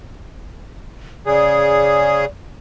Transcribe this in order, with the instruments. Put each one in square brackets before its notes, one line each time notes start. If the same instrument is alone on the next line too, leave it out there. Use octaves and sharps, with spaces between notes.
[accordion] C#3 G#4 [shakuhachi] D5